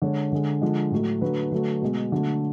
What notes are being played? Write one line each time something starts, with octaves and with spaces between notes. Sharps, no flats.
D3 G#3 C#5
D3 G#3
D3 F3 G#3
A2 F#3 A3
D3 F#3 A3 B4
D3 F#3 A3
B2 G#3
D3 F#3 A3